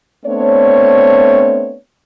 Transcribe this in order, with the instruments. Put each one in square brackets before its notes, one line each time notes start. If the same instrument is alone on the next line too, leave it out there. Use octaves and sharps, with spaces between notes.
[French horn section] A3 B3 C4 D4 C#5